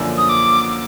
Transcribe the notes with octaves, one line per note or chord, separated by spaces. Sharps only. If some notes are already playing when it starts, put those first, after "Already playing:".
Already playing: F#2 D3 F3 A#3 D4
D#6
D6